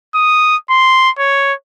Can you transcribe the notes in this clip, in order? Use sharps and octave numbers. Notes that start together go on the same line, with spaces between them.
D#6
C6
C#5